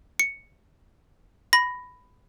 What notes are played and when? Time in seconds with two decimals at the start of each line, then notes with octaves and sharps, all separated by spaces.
0.20 C#7
1.53 B5 A#6